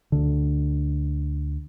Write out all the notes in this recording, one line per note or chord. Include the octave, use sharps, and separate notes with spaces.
D2 D3